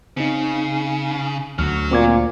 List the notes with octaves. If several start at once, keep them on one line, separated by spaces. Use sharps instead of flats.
C#3 C4 D#4
D2 F#3 F#4 F6
A#2 C4 D6 G#6